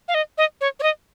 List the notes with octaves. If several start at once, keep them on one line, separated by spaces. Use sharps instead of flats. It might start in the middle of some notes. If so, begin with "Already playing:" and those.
F5
D#5
D#5
C#5
C#5
D#5